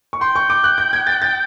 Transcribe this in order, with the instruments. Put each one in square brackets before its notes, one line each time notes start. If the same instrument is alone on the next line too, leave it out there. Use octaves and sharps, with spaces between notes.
[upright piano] C#6
[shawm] G5 [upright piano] C6
[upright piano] C#6
D6
F#6
G6
G#6
A6
A6